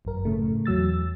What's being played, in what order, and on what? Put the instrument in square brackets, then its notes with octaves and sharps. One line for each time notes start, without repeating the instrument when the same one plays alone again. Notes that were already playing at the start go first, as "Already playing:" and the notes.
[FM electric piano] G1 F#2 A#4
A2 C#3 A3
E2 F#3 E6 A6